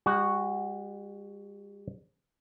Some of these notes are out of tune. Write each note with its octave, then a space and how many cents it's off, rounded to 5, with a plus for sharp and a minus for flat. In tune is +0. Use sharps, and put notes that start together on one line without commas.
G3 +45 F#4 +0